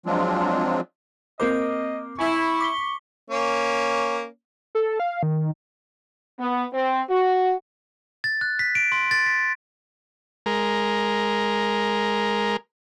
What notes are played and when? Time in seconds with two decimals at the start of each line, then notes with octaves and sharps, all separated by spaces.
0.06 F3 F#3 G#3 C4 D4 F4
1.40 A#3 C4 A#4 C5 D#5 D6
2.19 E4 G#5 C#6
2.60 D6 B6 G7
3.30 A#3 C#4
4.75 A4
5.00 F5
5.23 D#3
6.40 B3
6.74 C4
7.10 F#4
8.24 A6
8.41 F#6
8.59 B6
8.75 D7
8.92 C6
9.11 A6
9.26 B6
10.46 G#3 A#4